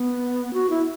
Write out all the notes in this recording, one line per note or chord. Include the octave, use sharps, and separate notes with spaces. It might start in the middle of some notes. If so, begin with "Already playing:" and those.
Already playing: B3
F#4
E4